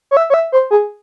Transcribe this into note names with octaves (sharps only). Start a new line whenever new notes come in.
C#5
E5
C#5
E5
C5
G#4